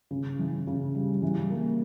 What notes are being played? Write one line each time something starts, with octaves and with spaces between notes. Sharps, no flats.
C#3
E3
C#3
G3
E3
A#3